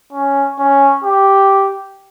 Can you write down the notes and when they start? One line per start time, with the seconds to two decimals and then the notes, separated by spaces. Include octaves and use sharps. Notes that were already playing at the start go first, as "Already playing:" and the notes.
0.13 C#4
0.59 C#4
1.04 G4